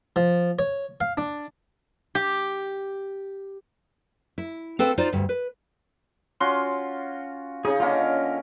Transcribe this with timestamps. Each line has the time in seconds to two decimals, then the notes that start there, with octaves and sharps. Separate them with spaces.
0.16 F3
0.59 C#5
1.01 F5
1.17 D4
2.15 G4
4.38 E4
4.79 C4 A4 B4 F5 G5
4.98 D#4 F4 C5 D5
5.13 D2 G2
5.29 B4
6.41 C#4 F4 F#4 C6
7.65 C#3 D#4 G#4
7.80 D3 A#3 C#4 F4 D#5